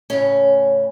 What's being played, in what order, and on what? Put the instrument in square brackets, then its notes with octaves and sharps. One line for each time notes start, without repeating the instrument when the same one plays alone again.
[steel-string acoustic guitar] A2 C#3 C#4